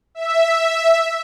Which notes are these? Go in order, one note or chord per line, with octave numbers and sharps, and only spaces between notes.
E5